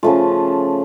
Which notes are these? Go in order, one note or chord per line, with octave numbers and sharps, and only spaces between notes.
C#3 F3 A3 F4